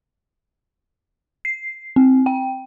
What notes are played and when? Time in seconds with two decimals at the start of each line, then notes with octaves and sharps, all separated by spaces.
1.45 C7
1.96 C4
2.26 G5